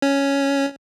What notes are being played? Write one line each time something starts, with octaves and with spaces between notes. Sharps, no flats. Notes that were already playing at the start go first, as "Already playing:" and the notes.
C#4